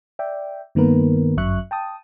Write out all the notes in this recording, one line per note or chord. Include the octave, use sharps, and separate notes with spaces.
D5 E5 G5
G2 D#3 A#3 B3 A#4 B4
G1 F#2 F#3 E5 C#6 F#6
G5 A5 D#6